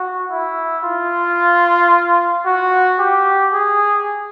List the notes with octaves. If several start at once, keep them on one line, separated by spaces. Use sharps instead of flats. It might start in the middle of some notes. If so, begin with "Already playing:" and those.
Already playing: F#4
E4
F4
F#4
G4
G#4